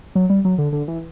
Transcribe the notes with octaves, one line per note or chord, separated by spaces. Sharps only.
F#3
G3
F#3
D3
D3
E3